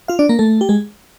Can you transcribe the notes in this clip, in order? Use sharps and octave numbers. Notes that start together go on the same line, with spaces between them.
F4 F5
D4 D5
A#3 A#4
A3 A4
G4
G#3 G#4